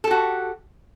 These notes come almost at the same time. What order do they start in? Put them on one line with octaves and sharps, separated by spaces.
A4 G4 F#4